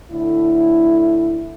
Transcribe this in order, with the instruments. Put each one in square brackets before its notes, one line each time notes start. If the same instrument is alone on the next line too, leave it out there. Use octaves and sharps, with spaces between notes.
[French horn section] A2 D3 E4